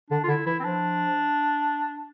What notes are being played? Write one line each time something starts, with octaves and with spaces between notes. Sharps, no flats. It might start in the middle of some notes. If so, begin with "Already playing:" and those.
D3 D4
F4
D3 E4
E3 E4
C4
F3 D4